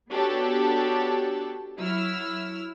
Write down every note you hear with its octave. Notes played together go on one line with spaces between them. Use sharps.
B3 D4 F#4 G4 A4 C#5
F#3 E4 E6 F6